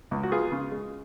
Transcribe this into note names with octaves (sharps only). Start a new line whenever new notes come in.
C#2
F#4
B3 F4 G#4
C#3
G#3